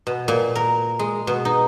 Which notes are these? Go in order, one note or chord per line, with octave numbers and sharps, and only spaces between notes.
B2
A#2
A#4
G#3
B2
D#4